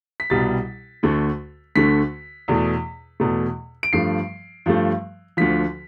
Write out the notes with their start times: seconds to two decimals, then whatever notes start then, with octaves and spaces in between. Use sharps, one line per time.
0.20 B6
0.30 C2 B2 G3 A6
1.03 D2 D3 A3
1.76 D2 D3 A3 B6
2.48 E2 B2 A3
3.20 E2 B2 A3
3.83 D7
3.93 G2 F3 A3 C7
4.66 G2 F3 A3
5.37 D2 D3 F3 B6